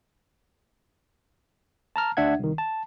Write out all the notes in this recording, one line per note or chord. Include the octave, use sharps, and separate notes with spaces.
A5 A#5 F6
D2 D4 E5 F#5 G#6
C2 D#3
A5